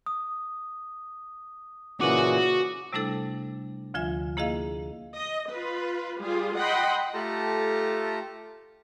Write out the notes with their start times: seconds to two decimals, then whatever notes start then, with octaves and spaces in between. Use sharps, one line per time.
0.06 D#6
2.01 A#2 C#3 E3 F#4 D6 D#7 F#7
2.93 C3 G3 A3 D4 E4 A4
3.94 D2 D3 F3 F4 E5 G#5
4.37 A#3 E4 G#4 D#5 F5
5.15 D#5
5.50 F4 B4
6.20 G3 F4 G#4
6.56 D#5 F#5 G5 B5 C6
7.14 A3 F4 G4 A4 A5 A#5